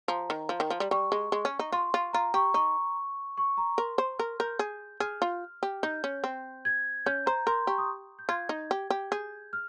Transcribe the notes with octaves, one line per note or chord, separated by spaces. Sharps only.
F3 A#5
D#3
F3
D#3
F3
G3
G3 C#6
G#3
G#3
C#4
D#4
F4 C6
F4
F4 A#5
G4 C#6
D#4 C#6
C#6
A#5
A#4 C6
C5
A#4 F6
A#4 G6
G#4
G#4 F6
F4
G4
D#4 G6
C#4
C4
G#6
C#4 G6
C5 A#5
A#4 C6
G4 C#6
D#6
G6
F4 G#6
D#4
G4
G4
G#4 G6
F6